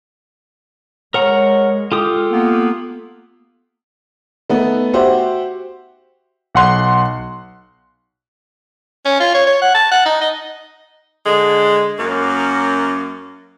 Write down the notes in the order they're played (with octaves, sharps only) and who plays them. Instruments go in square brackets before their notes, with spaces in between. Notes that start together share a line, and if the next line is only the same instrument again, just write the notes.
[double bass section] G#3 [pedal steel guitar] A#4 F#5 A#5 [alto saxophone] C#5
[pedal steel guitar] F4 G4 D#6 [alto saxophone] A4
[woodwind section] A#3 B3
[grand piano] A3 B3 D#4
F#4 G4 C5 E5 F#5
[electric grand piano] B1 F#5 C6 F#6
[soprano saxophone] C#4
F4
C#5
C#5
F#5
A5
F#5
D#4
D#5
[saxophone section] D3 G#3
F#2 A#3